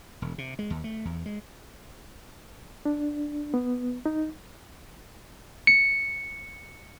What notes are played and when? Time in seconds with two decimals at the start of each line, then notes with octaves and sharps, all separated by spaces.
0.22 E1
0.38 C3
0.59 G#3
0.70 D#2
0.84 A3
1.05 E2
1.26 G#3
2.85 D4
3.54 B3
4.06 D#4
5.67 C#7